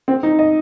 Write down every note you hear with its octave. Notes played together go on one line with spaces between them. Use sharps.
C4
D#4
D#5